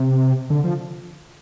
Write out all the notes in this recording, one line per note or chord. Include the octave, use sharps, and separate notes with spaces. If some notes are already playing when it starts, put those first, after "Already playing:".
Already playing: C3
D3
F3